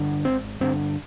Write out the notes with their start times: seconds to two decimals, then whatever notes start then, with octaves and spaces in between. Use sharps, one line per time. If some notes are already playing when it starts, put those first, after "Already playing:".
Already playing: G2 D3
0.25 G#1 C4
0.60 G2 D3 C4